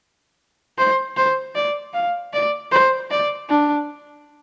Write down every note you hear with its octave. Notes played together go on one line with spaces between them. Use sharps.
C5
C5
D5
F5
D5
C5
D5
D4